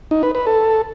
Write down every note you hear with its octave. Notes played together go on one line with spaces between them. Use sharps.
D#4
B4
B4
A4